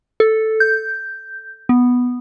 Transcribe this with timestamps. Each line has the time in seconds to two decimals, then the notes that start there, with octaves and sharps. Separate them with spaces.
0.20 A4
0.60 G6
1.69 B3